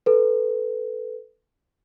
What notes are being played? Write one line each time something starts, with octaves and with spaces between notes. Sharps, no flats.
A4 B4